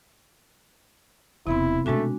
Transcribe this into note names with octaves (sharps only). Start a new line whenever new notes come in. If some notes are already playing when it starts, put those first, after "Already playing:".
E1 C3 B3 C4 D#4 E4
B2 D#3 G#3 A3 D4 F#4